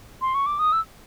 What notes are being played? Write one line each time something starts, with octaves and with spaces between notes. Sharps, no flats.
C6
C#6
D6
D#6
E6